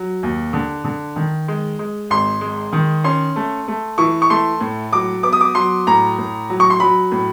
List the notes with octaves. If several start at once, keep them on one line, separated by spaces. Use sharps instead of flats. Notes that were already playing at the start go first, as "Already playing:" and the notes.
Already playing: F#3
D#2
D3
D3
D#3
G#3
G#3
G#1 C6
G#3
D#3
C#4 C6
A3
A3
E3 C#6
C#6
A3 C6
A2
F#3 D6
B3 D6
D#6
D6
F#3 C6
A2 A#5
A2
F#3
C#6
C6
F#3 B5
A2